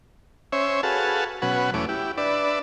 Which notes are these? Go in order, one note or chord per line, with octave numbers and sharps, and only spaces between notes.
C#4 C5 C#5 E5
F#4 G#4 A4 B4 F5 A5
B2 F#3 C#4 B4 F#5
E2 A3 C#4 D6
E4 G4
D4 B4 D5 E5